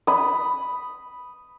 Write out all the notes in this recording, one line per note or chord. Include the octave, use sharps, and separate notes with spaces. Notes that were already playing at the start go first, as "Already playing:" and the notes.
B5 D#6